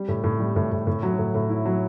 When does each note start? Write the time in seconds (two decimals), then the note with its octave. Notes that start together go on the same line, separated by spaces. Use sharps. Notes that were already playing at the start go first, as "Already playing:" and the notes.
Already playing: G3
0.08 A2
0.24 A2
0.40 G3
0.56 A2
0.72 A2
0.87 A2
1.03 F#3
1.19 A2
1.34 A2
1.50 E4
1.66 F#3